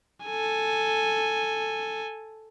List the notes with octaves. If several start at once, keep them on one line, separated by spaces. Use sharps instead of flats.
A4 G#5